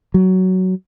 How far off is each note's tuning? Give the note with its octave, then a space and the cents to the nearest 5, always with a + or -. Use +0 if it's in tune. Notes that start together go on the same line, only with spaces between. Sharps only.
F#3 +10